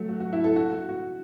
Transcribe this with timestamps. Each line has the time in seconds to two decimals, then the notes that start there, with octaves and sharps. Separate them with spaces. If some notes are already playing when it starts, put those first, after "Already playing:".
Already playing: F#3 A3
0.09 F#4
0.20 F#4
0.33 E4
0.44 A4
0.56 F#4
0.72 F#4
0.89 F#4